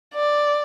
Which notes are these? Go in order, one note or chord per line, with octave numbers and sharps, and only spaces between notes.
D5